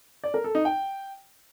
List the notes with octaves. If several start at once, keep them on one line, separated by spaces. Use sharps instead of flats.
D5
A#4
A4
D#4
G5